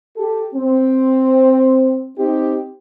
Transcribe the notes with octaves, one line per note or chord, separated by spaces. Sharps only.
G4 A4
C4
C4 D#4 G4